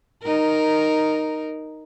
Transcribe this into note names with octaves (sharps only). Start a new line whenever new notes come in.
D#4 A#4